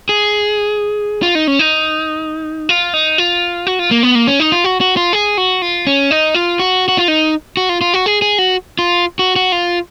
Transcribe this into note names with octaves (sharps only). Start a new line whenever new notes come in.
G#4
F4
D#4
C#4
D#4
F4
D#4
F4
F#4
F4
A#3
B3
A#3
C#4
D#4
F4
F#4
F#4
F4
G#4
F#4
F4
C#4
D#4
F4
F#4
F#4
F4
D#4
F#4
F4
F4
F#4
G#4
G#4
F#4
F4
F#4
F#4
F4